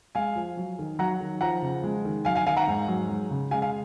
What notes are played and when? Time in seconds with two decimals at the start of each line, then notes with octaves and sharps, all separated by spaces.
0.15 G#3 F5 G#5
0.35 F3
0.57 F#3
0.79 D#3
0.99 F#3 F#5 A#5
1.20 D#3
1.41 F3 F#5 A#5
1.62 C#3
1.84 G#3
2.05 D#3
2.25 F#3 F5 G#5
2.35 F5 G#5
2.46 D#3 F5 G#5
2.57 F#5 A#5
2.68 G#2
2.88 F#3
3.09 G#3
3.31 C#3
3.51 G#3 F5 G#5
3.62 F5 G#5